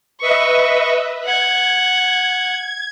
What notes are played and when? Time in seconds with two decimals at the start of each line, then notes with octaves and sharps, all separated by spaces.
0.20 B4 D#5 E5 C#6
1.25 F#5 G#6